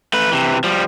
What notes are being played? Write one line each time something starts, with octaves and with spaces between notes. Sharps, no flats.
A3 B4
C3 E3
F3 G3